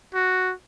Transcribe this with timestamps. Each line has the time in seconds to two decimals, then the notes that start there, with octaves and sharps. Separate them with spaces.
0.14 F#4